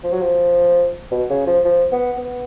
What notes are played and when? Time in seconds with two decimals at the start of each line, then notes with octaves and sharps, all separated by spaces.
0.03 F3
0.12 F#3
0.21 F3
1.11 B2
1.30 C#3
1.47 F3
1.65 F3
1.92 B3
2.18 B3